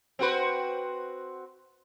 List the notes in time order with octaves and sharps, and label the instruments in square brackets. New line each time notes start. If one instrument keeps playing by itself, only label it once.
[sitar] C4 F#4 B4